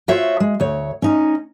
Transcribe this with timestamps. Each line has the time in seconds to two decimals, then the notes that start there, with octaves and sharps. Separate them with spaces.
0.08 F4 F#4 C5 C#5 E5
0.40 G#3
0.60 D2 C#5
1.02 C#4 D#4